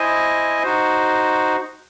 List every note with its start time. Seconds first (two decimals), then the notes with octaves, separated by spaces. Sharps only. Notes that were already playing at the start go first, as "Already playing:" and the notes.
Already playing: E4 C5 D#5 G#5
0.63 D#4 F#4 C5